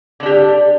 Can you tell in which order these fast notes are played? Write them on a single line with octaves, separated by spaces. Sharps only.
D3 D4 G4